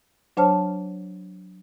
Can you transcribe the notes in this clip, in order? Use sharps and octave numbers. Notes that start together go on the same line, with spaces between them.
F#3 D4 C5 C#5 A5 F6